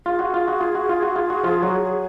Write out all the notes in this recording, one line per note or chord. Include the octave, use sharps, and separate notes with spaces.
F4 G#4
F#4
F4
F#4
F4
F#4
F4
F#4
F4
F#4
F3 F4
F#3 F#4